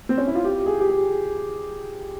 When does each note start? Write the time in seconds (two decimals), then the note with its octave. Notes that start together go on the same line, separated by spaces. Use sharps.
0.09 C4
0.18 C#4
0.27 E4
0.35 F4
0.45 G4
0.66 G#4
0.80 G4
0.89 G#4